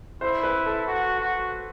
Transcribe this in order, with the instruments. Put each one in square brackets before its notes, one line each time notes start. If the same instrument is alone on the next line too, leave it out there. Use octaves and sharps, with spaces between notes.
[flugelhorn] E4 [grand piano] C5
[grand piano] B4
A4
[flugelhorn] F#4
F#4